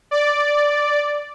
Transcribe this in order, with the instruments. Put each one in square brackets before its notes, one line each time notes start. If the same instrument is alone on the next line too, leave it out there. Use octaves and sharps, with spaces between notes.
[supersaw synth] D5